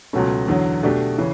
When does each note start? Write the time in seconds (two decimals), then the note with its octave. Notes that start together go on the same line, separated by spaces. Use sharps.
0.13 C#2 B2 F#3 A3 C#4
0.48 E2 D3 F#3
0.83 B2 A3 D4 G4
1.18 C#3 E3